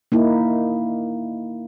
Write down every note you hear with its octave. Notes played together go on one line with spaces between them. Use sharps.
A#3 D#4 E4